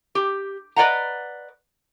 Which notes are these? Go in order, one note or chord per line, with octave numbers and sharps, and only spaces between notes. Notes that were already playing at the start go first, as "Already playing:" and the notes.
G4
B4 D5 D#5 F#5 A#5